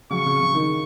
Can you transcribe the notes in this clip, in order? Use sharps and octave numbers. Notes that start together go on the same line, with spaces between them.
C#3 F#3 C#6
C#3
C#3
D#3